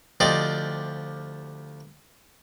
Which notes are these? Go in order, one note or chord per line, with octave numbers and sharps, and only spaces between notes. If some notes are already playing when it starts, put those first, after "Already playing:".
D2 F3 G4 C5 D5 D#5